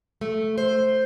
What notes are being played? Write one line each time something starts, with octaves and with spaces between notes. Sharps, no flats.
A3
C5